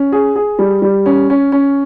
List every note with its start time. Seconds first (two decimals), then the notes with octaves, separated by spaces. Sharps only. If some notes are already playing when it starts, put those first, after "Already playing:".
Already playing: C#4
0.12 G#4
0.36 G#4
0.59 G3
0.82 G3
1.06 C#4
1.30 C#4
1.52 C#4